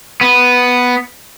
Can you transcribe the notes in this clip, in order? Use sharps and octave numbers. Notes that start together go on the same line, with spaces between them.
B3